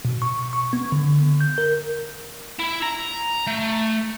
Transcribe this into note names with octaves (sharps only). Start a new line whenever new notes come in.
B2
C#6
C#6
B3
D3
D3
G6
A#4
E4
A#5
A3